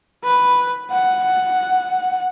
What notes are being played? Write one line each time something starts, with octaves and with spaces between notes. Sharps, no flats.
B4
F#5